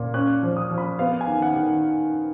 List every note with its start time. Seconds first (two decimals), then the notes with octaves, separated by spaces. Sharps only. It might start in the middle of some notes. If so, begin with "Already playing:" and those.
Already playing: A#2
0.14 C#4 F#6
0.43 F3
0.57 D#6
0.71 F3
0.78 B5
0.99 B3 F5
1.21 G#5
1.27 D#3
1.42 F#5
1.56 D#3